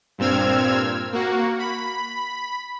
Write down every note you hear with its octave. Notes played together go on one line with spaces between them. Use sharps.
G2 A#2 C4 E6 F6 G#6
A#3 F#4
B5